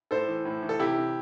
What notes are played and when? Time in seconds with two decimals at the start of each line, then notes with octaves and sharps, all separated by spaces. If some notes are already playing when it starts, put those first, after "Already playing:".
0.11 A2 A4 C5
0.28 E3
0.45 A2
0.63 E3
0.69 A4
0.79 C3 E4 G4
0.97 C3